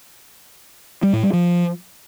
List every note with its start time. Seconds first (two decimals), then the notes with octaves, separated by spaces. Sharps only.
1.03 G3
1.13 A2
1.23 G3
1.33 F3